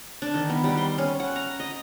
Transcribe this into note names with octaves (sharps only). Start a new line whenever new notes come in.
D4
D#3
B3
G3
C6
C#4
F#5
A#5
D#5